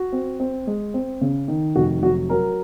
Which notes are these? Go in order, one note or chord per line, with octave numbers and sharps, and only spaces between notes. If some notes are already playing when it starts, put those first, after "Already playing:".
Already playing: F#4
C4
C4
G#3
C4
C#3
D#3
F1 F#4
F#3 F#4
F#3 A#4